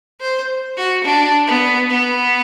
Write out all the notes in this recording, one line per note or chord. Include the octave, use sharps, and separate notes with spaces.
C5
F#4
D4
B3
B3